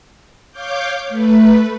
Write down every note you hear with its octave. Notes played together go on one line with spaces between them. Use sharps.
C#5 F5 D6 G6
A3 B4